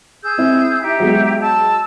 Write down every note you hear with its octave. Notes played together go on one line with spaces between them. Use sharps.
G#4 E6 G6
C4 E4
D#4 G4 E5
F#3 G#3 B3
A5 E6